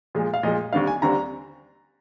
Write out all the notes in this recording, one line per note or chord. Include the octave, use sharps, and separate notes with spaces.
A#2 F3 G#3
F5
A#2 F3 G#3 D#5
D#2 D3 G3 C4 F5
G#5
D#2 D3 G3 C4 A#5